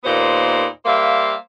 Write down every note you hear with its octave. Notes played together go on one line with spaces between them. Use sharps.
D#2 A#2 B3 D#4 C5
G3 A#3 C5 E5 F5